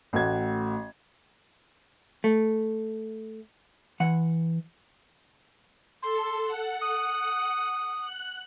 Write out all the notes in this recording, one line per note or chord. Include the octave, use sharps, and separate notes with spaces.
A1 A3 F#4 G#6
A3
E3 F#5
A4 C6
F#5
D#6
F#6